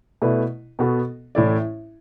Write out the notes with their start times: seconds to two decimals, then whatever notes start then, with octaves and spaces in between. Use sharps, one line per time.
0.22 B2 A3 E4 B4 D5
0.79 B2 B3 F#4 A4
1.35 A1 A2 A3 E4 D5